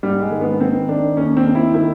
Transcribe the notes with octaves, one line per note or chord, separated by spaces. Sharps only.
G#2 G3
G#3
D#3
B3
D#3 C4
D#3 D4
D#2 C#4
C4
D#2
E4
D#3 E4